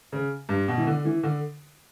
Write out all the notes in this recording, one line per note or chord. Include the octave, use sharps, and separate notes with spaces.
C#3
G2
B2
E3
D3
E3
D3